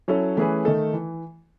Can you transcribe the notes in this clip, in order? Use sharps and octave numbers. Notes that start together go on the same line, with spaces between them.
F#3 C#4 E4 A4 C#5
E3 A3 C#4 G#4 B4
D#3 A3 D#4 A4
E3